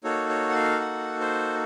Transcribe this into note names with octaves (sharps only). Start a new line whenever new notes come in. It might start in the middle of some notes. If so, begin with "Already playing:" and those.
A#3 D#4 F#4 A4 C#5
C#5
F#5
F5
F#5
C5